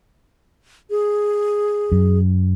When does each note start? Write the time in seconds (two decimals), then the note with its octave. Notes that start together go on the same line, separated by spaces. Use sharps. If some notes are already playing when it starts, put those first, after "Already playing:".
0.90 G#4
1.92 F#2